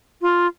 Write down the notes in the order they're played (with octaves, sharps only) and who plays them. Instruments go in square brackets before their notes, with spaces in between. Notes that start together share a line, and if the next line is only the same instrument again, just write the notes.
[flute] F4